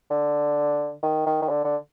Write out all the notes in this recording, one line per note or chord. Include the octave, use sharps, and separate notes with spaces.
D3
D#3
D#3
D#3
D3
D3